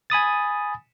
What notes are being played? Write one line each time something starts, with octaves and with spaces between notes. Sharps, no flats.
G#5 B5 D#6 A6